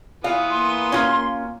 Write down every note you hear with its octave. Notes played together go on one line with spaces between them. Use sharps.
E3 B3 F4 F5 D#6
A#3 C6
C#4 F4